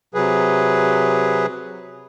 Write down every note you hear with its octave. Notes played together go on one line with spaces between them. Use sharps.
C3 F#3 G#4 B4